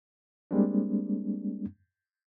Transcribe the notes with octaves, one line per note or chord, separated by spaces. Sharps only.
G3 G#3 A#3 C4 D4